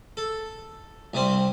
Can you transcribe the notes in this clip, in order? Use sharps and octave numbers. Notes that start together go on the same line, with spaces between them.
A4
C2 C3 G3 C4